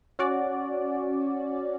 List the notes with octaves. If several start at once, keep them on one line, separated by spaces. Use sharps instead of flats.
C#4 F#4 D5